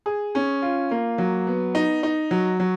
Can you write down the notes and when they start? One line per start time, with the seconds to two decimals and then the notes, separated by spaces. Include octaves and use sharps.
0.06 G#4
0.35 C#4
0.62 F4
0.91 A#3
1.18 F#3
1.47 B3
1.75 D#4
2.03 D#4
2.31 F#3
2.60 F#3